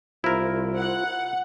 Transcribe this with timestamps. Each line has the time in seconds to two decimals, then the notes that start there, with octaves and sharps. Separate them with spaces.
0.24 C2 E4 F4 A#4 C5
0.77 F#5